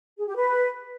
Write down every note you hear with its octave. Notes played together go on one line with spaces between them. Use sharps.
G#4
G4
B4